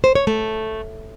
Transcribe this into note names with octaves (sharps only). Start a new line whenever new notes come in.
C5
C#5
A3